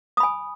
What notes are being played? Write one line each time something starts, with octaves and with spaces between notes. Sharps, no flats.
G#5 B5 D#6